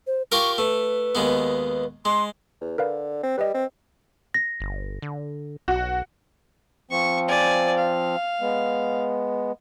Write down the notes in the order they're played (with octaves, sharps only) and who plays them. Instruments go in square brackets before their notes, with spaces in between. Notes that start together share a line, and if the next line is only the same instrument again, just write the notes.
[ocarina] C5
[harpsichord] F4 G4 A#4 [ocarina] C#6
[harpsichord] A3 [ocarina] B4
[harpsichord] D#2 G#3 B3
[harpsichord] G#3 [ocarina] C6
[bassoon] E2
[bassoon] D3 [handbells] A#4 B4 F5
[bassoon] C4
[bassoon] G3 [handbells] B4 D#5
[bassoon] C4
[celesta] A#6
[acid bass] G1
D3
[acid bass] B1 [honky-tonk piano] F#4
[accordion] F3 C4 [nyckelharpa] C#6
[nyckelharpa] D5 G#5
F5
[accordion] G#3 B3